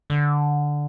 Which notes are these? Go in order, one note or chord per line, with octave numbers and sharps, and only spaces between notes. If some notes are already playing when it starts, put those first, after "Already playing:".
D3